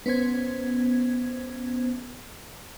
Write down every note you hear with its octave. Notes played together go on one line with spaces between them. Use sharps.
B3 C#4 C5 G#6